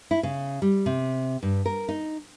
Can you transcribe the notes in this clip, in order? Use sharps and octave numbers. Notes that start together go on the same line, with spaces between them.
E4
C#3
G3
C3
G2
A#4
D#4